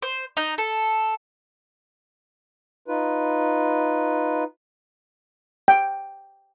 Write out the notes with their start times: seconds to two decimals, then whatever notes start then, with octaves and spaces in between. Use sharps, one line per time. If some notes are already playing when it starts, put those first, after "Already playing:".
0.02 C5
0.37 D#4
0.58 A4
2.88 D#4 F4 B4
5.68 G5